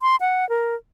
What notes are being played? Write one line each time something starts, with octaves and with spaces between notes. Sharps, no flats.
C6
F#5
A#4